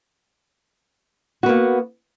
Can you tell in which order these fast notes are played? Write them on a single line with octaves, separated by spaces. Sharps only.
F#4 B3 A#3